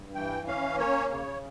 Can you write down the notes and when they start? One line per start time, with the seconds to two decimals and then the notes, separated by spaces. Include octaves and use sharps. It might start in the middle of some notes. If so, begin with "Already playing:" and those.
Already playing: G2
0.15 E3 G5
0.47 C#4 F5
0.79 A#3 C#5
1.10 C#3 C#5